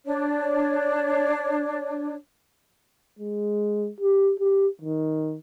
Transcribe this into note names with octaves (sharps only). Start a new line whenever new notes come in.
D4 C#5
G#3
G4
G4
D#3